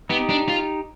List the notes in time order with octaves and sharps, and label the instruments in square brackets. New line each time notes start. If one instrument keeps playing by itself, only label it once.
[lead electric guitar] B3 [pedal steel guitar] D#4 G4
[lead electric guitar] D4
F4